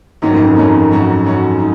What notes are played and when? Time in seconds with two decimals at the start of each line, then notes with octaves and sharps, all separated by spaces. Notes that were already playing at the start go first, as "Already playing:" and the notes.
0.22 G#2 D#3 F#3 C#4
0.33 F2
0.45 F#2
0.56 F2 D#3 F#3 C#4
0.91 G#2 F#3 C#4 F#4
1.25 G#2 F#3 C#4 F#4
1.59 D#4